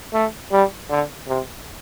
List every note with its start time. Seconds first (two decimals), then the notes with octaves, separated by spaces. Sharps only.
0.14 A3
0.52 G3
0.90 D3
1.28 C3